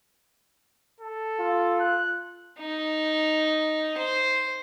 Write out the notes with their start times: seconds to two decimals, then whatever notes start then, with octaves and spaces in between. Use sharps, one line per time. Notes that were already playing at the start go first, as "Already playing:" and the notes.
1.00 A4
1.40 F4
1.80 F#6
2.60 D#4
3.98 C5